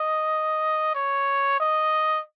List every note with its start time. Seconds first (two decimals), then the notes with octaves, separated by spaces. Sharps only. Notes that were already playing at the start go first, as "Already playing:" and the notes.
Already playing: D#5
0.95 C#5
1.60 D#5